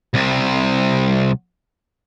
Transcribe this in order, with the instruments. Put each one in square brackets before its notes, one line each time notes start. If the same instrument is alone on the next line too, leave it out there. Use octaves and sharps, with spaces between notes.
[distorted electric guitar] C2 C3